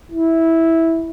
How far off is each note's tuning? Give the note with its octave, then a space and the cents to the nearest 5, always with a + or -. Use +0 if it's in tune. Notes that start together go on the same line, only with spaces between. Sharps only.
E4 -10